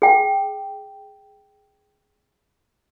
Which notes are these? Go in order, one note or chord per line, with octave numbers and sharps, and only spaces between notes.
G#4 G5